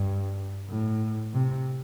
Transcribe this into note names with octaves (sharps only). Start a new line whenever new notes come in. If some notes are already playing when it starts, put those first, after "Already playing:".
Already playing: G2
A2
C3